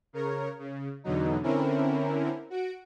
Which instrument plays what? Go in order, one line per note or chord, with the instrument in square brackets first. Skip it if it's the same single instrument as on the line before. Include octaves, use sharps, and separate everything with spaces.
[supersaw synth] C#3 A#4 C#5
C#3
E2 B2 D3 F#3 D#4
D3 C4 C#4 E4 A#4
F#4 D7